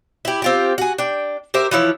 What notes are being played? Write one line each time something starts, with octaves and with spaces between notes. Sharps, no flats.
E4 G4
C4 F4 G4
F#4 G#4
D4 G5
G4 A#4 C5 E5
E3 F3 E4 C#5